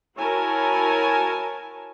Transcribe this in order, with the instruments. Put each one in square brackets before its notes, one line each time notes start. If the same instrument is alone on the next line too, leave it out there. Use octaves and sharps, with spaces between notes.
[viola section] E4 F#4 A#4 C#5 G#5 A5